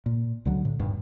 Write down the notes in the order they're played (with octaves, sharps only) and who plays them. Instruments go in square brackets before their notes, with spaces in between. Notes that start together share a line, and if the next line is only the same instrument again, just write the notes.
[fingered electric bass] A#2
C#2 D3 F#3
A2
D#1 G2